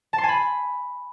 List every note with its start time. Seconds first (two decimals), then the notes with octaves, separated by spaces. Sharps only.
0.13 A5
0.18 C6
0.23 G#5
0.29 B5